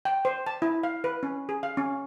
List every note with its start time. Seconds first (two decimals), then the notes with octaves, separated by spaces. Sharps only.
0.05 G5
0.25 C5
0.47 A5
0.62 E4
0.83 F5
1.04 B4
1.23 C#4
1.49 G#4
1.63 F5
1.77 C#4